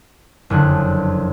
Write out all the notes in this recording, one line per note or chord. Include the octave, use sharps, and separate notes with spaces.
F#1 F2 D3 F#6